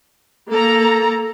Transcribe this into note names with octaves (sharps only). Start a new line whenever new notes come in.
A#3 A4 A#5